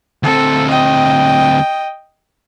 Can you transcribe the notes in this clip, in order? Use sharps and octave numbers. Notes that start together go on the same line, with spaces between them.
D2 C4 A4
D#5 G5